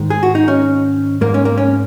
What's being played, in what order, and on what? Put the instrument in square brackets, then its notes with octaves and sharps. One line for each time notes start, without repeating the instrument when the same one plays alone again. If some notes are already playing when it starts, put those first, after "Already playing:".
Already playing: [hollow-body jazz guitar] G#2 D#3 G#3
G#4
F#4
D#4
C#4
G#2 G#3 A#3
C#4
A#3
C#4